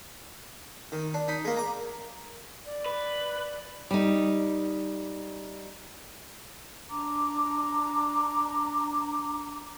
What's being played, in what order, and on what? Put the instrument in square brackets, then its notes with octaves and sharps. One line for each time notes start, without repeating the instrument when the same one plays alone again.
[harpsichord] D#3
D4
D#4 B5
G#3 A#3
A#5 D6
[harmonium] D5
[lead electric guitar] B4
[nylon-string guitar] G3 D#4
[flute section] D4 A#5 D6